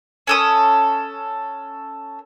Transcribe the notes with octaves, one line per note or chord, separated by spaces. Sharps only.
C#4 A4 D#6